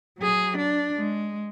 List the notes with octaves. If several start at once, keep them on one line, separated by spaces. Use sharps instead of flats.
F#3 G#4
D4
G#3